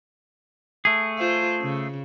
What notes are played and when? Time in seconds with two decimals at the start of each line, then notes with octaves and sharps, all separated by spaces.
0.85 A3 G#4
1.18 F4 C5
1.62 C#3